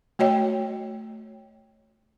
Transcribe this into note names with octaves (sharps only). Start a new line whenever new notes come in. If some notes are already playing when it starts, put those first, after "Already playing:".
A3 F#4 C#5 D#5 G5